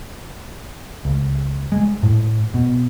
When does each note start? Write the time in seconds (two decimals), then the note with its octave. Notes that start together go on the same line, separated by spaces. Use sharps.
1.05 C#2
1.72 G#3
2.03 A2
2.54 B2